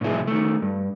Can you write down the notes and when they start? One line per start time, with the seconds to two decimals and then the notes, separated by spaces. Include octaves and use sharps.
0.01 A2 C3 F3 E4 G#4
0.27 D#3 A3
0.62 G2